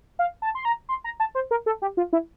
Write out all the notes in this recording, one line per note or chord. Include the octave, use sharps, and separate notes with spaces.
F5
A5
C6
A#5
C6
A#5
A5
C5
A#4
A4
G4
F4
E4